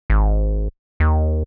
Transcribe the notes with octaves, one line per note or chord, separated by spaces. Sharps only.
G#1
D#2